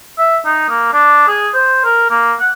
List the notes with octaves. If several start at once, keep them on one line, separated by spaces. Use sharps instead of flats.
E5
D#4
A#3
D4
G#4
C5
A#4
A#3
F#5